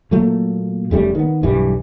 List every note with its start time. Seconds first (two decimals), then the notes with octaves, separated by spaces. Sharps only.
0.11 A#2 F#3 A3 A#3
0.91 F1 C#3 G3 A3
1.15 D#3 B3
1.43 B1 G2 E3 G3